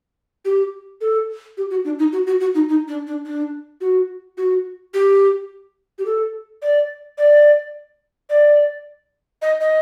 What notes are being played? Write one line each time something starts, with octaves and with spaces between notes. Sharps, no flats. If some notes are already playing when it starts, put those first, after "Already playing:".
G4
A4
G4
F#4
D4
D#4
F#4
F#4
F#4
D#4
D#4
D4
D4
D4
F#4
F#4
G4
G4
A4
D5
D5
D5
D#5
D#5